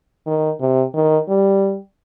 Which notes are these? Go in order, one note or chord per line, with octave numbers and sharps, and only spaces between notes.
D#3
C3
D#3
G3